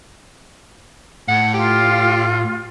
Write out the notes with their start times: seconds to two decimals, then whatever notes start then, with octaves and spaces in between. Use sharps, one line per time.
1.28 A2 F#5
1.54 F4 G4